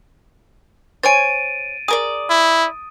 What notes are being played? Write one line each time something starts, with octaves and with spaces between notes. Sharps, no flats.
C5 C#5 G#5 A6 D7 D#7
G#4 A#4 D5 D#6
E4